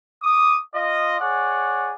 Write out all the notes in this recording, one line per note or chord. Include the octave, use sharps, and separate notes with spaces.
D6 D#6
F4 D#5
G#4 C#5 D5 F#5